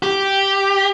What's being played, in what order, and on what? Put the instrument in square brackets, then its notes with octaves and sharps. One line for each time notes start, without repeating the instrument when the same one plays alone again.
[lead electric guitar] G4